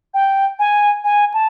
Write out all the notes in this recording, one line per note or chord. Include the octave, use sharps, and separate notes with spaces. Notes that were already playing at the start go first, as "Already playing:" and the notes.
G5
G#5
G#5
A5